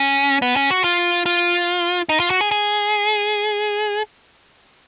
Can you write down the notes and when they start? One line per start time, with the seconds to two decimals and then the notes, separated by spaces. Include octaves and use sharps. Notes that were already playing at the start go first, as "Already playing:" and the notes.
Already playing: C#4
0.42 B3
0.56 C#4
0.71 F#4
0.84 F4
1.26 F4
2.09 D#4
2.20 F4
2.30 F#4
2.41 G#4
2.51 G#4